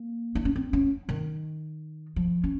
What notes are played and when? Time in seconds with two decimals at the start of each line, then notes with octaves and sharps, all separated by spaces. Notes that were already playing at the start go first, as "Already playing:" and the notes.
Already playing: A#3
0.35 D#4
0.45 C#4
0.56 C4
0.73 C#4
1.09 D#3
2.16 F3
2.44 C#4